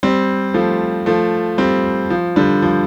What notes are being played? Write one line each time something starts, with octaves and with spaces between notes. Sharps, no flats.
G3 C4
F3 A3
F3 A3
G3 C4
F3
D3 G3
F3